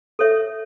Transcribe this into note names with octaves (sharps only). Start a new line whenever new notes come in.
A4 C#5 E5